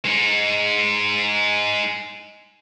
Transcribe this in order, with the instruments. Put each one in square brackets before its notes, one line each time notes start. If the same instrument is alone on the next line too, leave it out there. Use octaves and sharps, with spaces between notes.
[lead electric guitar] G#3 D#4